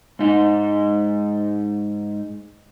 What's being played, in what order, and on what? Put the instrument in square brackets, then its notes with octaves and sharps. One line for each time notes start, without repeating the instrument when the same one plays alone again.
[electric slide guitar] G#2 D#4